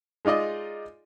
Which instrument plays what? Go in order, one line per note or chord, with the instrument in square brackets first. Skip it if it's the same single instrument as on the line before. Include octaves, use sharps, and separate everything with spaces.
[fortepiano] G#3 D#4 F4 D5 D#5